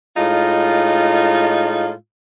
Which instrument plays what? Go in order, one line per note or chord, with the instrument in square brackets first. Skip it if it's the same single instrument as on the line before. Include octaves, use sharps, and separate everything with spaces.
[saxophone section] A2 G#3 D#4 F4